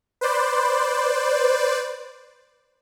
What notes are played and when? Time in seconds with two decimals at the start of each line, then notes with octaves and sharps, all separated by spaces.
0.21 B4 C5 D5